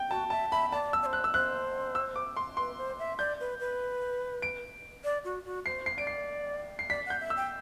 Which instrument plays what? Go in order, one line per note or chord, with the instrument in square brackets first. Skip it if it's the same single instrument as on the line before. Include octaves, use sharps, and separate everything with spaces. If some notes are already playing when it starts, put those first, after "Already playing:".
Already playing: [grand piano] G5
[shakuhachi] F#4 [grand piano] A5
[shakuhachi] E5 [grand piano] A5
[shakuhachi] E5 [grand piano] B5
[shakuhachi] D5 [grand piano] A5
[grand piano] E6
[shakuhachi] D5
C5
[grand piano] F#6
E6
[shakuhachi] C5 [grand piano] F#6
[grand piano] E6
D6
C6
[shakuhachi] B4 [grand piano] C6
[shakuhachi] C5
E5
[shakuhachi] D5 [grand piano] G6
[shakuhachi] B4
B4
[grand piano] D7
[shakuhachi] D5
F#4
F#4
[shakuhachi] C5 [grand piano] C7
[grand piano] C7
[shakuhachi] D5 [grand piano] D7
[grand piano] C7
C7
[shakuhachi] D5 [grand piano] B6
[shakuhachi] F#5 [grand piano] G6
[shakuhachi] E5
[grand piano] E6
[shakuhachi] G5